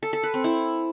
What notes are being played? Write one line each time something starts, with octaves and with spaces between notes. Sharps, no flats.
A4
A4
B4
C4
E4